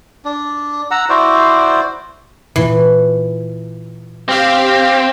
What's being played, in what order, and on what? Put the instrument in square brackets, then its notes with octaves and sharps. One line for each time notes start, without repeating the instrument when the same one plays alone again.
[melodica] D4
F#5 A#5 E6
E4 F#4 C5 D5
[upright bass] A#2 F4 [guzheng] E3
[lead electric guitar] C4 [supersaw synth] G4 F5